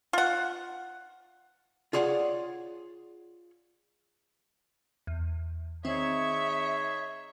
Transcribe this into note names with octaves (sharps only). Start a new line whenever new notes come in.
F4 F#5
F4 G#4 C#5 D5 F#5
E2
D#3 C4 D#4 G#4 C#5 E5